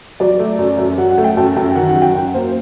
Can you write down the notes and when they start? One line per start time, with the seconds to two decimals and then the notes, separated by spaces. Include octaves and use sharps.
0.20 F#3 D5
0.39 A3
0.59 F#2
0.78 F#2
0.98 F#3 F#5
1.11 F#5
1.18 A3
1.24 G5
1.37 F#2 A5
1.56 F#2 G5
1.75 D#3 F#5
1.89 F#5
1.96 F#3
2.02 G5
2.15 F#2 F#5
2.34 A#3 C5